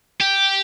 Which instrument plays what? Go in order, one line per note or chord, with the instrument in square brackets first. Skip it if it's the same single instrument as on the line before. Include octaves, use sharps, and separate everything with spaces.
[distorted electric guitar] G4